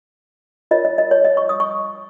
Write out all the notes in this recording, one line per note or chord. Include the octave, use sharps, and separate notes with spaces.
F4 A#4 C#5 D#5
D#5
D#5
C#5
D#5
C#6
D#6
C#6